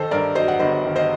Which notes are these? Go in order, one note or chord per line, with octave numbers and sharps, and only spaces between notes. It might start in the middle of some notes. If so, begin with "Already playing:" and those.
Already playing: D#3 A4 C5
G2 A#4 D5
F#3 C5 D#5
F#5
G1 C5 D#5
D#3
C5 D#5